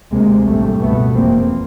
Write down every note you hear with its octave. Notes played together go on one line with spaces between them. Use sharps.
D2 C3 G#3 A#3
A1 G2 G3 A3
C#2 B2 A3 B3
F1 E2 C3 A#3 C4